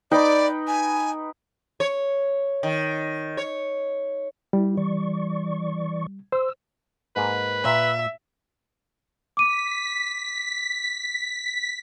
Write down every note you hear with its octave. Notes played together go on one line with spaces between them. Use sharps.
D#4 B4 D5 G5
G#5
C#5
D#3
C#5
G3 E4
E3 D5 C#6
C5 E6
G#2 A#3 G#4 B4
A#2 E5
D6 B6 D#7